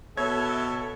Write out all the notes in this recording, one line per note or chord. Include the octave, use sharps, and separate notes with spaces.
B2 A4 C#5 E5 G#6